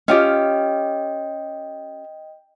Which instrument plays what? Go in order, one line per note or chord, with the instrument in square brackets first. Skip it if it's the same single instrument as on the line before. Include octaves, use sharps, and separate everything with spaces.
[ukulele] C#4 F4 G4 [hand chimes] D#5 G5